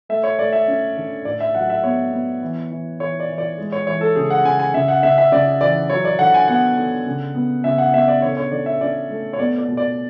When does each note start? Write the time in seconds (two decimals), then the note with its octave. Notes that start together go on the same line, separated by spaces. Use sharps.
0.09 A3 E5
0.24 C#5
0.39 A3 D5
0.53 E5
0.68 C#4
0.97 D3
1.25 A2 D5
1.40 E5
1.55 F#3 F#5
1.70 E5
1.84 B3 C#5
2.13 B3
2.42 E3
2.71 E3
3.00 E3 C#5
3.20 D5
3.29 E3
3.38 D5
3.58 G#3
3.72 C#5
3.87 E3 C#5
4.01 A4
4.16 C#3 G#4
4.30 F#5
4.45 C#3 G#5
4.59 G#5
4.74 C#3 E5
4.88 F#5
5.03 C#3 E5
5.18 E5
5.32 C#3 D5
5.61 E3 D5
5.90 F#3 C#5
6.05 D5
6.19 D3 F#5
6.34 G#5
6.48 B3 F#5
6.77 D3
7.06 C#3
7.35 B3
7.64 C#3 E5
7.78 F#5
7.94 B3 E5
8.08 D5
8.22 D3 C#5
8.37 C#5
8.51 D3 D5
8.66 E5
8.81 C#4 D5
9.10 A3
9.33 C#5
9.39 B3 D5
9.58 D5
9.68 B2
9.77 D5